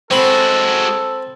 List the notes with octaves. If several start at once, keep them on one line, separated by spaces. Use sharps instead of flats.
G#3 C4 F#4 A4 B5